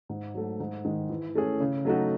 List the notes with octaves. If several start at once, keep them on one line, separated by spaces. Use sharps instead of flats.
G#2
F#3 A3
G#2
D#3 G#3
E3
A3 C#4 G#4
C#3
F#3 A3 D#4 F#4